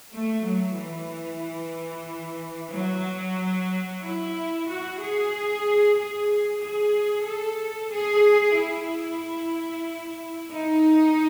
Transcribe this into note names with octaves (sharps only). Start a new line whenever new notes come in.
A3
F#3
E3
F#3
E4
F#4
G#4
G#4
G#4
A4
G#4
E4
D#4